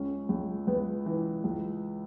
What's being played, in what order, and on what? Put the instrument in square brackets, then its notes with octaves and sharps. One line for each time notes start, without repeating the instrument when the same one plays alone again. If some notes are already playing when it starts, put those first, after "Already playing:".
Already playing: [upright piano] C#2 C#4
C#2
C#2 B3
E3
C#2